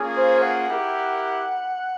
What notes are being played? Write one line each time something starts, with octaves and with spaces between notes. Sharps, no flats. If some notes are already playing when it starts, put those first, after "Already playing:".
Already playing: A#3 C#4 F4 G#4
C5
F#5
E4 G4 A#4